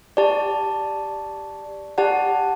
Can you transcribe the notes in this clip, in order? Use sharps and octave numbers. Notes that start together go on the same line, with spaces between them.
G4 D5 A5
G4 D5 F#5 A5